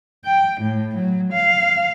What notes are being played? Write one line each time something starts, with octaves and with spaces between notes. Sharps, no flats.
G5
A2
F#3
F5